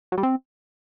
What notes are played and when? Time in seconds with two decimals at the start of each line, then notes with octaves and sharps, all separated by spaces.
0.12 F#3
0.18 G3
0.23 C4